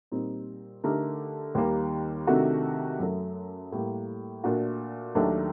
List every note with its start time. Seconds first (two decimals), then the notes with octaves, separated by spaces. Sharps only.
0.12 A#2 G3 C4 D#4
0.84 D3 A3 D#4 G4 A#4
1.55 D#2 D#3 G3 A#3
2.27 C3 D#3 A3 D4 F#4
2.99 F#2 F#3 A3
3.72 A2 G3 A#3
4.43 A#2 A3 D4 F#4 A4
5.15 D#2 D#3 F#3 A3 D4